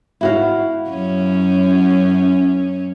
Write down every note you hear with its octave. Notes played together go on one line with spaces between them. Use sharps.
E4 F#4 F5
F#2 C#4